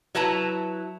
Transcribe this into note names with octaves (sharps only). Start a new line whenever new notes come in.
F#3 E4 B4 A5 A#5